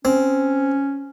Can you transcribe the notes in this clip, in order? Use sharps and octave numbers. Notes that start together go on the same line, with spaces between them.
C4 C#4